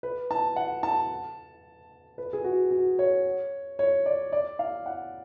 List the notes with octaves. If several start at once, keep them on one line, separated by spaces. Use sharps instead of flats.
B4
A5
F#5
A5
B4
G#4
F#4
F#4
C#5
C#5
D5
D5
F5
F#5